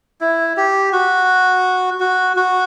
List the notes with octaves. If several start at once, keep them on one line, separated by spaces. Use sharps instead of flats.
E4
G4
F#4
F#4
F#4